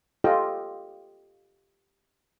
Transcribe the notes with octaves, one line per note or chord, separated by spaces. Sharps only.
F4 G4 A4 D#5 F5 G5